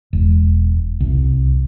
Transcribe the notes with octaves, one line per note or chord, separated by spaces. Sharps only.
E1
C2